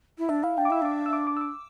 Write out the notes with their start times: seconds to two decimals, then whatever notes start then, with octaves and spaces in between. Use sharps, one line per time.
0.18 E4
0.29 D4 E5
0.43 E4 F5
0.57 D4 G5
0.65 D6
0.70 E4 E6
0.82 D4 D6
1.06 E6
1.13 D6
1.27 D6
1.37 E6
1.41 D6